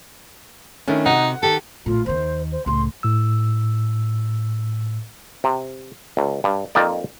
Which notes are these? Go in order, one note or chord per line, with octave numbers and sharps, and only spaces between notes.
D#3 A3 C#4 D4 E4
C3 D#4 F#4 F#5
D#3 G4 A4
A#1 A2 F4
D#2 D#3 C5
C5
C#2 A2 C6
A2 E6
C3
C#2
G2
F2 A#3 C4 D#4 D5